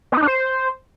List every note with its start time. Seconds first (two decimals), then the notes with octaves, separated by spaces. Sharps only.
0.12 B3
0.17 D#4
0.22 D4
0.28 C5